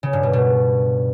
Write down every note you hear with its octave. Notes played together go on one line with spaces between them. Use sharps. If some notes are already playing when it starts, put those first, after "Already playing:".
C#3
G2
B2
B2